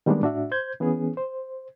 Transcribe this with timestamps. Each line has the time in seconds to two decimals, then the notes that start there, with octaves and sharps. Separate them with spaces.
0.06 D#3 G3 G#3 A#3 B3 D4
0.22 A2 D4 F#4 E5
0.51 C5 G6 G#6
0.80 E3 B3 C#4 G#4
1.17 C5